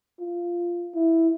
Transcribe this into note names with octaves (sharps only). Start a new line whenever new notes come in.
F4
E4